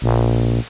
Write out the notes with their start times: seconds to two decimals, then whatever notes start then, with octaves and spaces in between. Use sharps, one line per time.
0.02 A#1